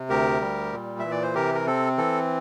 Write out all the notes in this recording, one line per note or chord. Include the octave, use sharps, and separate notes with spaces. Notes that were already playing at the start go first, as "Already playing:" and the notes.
Already playing: C3
D2 G4 A#4
G3
A#2
E3 E5
D5
C5
C3 G4 A#4
A#4
C4 A4
E3 A4